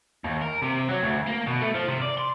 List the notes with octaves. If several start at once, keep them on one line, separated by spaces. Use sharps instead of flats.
D#2
A#4
C3
F#3
D2
A#3
B2
A3
F3
C3
D5
C6